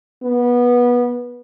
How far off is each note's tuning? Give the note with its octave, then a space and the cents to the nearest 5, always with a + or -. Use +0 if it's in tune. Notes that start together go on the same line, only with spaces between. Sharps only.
B3 -20